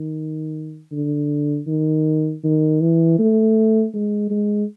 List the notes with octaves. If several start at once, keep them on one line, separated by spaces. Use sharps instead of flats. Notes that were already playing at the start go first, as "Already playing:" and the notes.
Already playing: D#3
D3
D#3
D#3
E3
A3
G#3
G#3